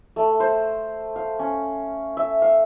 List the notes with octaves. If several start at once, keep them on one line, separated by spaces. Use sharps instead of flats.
A3
C5
F5
C#4
E5
F5